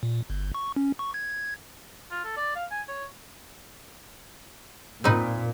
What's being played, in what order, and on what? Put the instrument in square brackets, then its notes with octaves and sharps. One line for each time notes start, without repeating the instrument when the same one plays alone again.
[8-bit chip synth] A#2
G1
C#6
C#4
C#6
G#6
[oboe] F4
A4
D5
F5
G#5
C#5
[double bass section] A#2 [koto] C4 D#4 B4